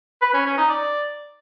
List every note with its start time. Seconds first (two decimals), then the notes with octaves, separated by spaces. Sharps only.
0.22 B4
0.34 C#4
0.46 C#4
0.58 D#4
0.70 D5